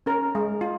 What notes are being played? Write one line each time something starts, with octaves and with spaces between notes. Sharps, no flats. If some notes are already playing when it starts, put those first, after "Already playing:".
C#4 A#4
G#3
F4